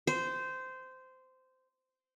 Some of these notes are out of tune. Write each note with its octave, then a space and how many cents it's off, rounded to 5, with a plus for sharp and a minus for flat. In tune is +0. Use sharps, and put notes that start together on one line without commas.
C5 -15